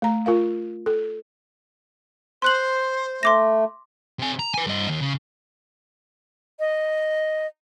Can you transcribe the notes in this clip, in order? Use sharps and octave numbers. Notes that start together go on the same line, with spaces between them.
A3 A#5
F4 A#4 F5
A4
C5 C6 F#6 F#7
A3 C6 D6 A#6
C3 G#5
A#5
B4 G#5
G2 D#5
D#2
C#3
D#5